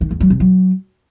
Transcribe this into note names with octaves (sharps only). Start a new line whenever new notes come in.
D#3
E2
F#3
C3
F#3